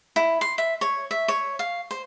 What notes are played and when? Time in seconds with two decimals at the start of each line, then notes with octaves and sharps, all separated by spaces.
0.16 E4
0.41 C6
0.58 E5
0.81 C#5
1.11 E5
1.28 C#5
1.59 F5
1.91 C5